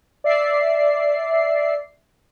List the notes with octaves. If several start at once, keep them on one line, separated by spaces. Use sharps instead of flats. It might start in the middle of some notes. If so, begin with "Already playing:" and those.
D5 E5 C7